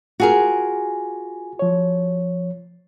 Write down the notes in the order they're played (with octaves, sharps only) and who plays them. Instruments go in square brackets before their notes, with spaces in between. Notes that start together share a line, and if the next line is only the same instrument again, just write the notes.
[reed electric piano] F4 G#5 [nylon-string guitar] F#4 G#4 A#4
[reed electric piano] F3 C#5